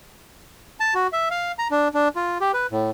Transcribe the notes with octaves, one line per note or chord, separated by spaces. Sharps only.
A5
F#4
E5
F5
A#5
D4
D4
F4
G4
B4
A2